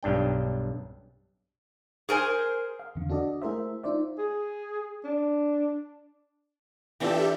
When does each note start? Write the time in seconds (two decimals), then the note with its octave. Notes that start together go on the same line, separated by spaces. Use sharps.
0.03 B1 G2 D4 G5
2.09 G#4 A#4 C5 G#5
2.79 F5
2.95 E2 D3
3.10 D4 F#4 A4 D5 D#5
3.42 A3 E4 G#4 A#4 C5 E5
3.84 D#4 F4 C5 D5 E5
4.18 G#4
5.04 D4
7.00 E3 D4 F4 G4 A4 E5